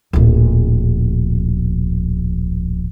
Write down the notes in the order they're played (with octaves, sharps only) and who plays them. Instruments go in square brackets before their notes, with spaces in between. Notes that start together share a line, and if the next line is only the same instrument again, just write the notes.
[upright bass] D1 A#1